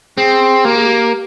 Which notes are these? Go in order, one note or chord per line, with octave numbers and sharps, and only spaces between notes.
C4 G#4
A#3 G4
G#4
G4